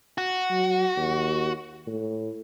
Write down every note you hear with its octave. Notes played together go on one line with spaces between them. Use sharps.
F#4
F#3
D#2
A2